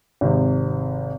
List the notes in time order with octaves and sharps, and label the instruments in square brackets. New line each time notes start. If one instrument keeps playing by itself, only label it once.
[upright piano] G#1 C3